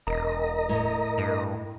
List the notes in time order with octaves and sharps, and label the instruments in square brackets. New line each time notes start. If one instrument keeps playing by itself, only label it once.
[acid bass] E1 [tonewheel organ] A#4 D#5 A#5
[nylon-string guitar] A2
[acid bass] G2